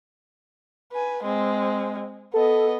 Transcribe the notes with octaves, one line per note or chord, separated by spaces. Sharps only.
B4 G#5
G#3 C4
B3 A4 D#5